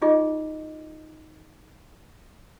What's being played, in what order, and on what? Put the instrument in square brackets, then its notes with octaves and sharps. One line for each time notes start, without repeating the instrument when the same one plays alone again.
[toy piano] D#4 F4 G#4 D#5 D6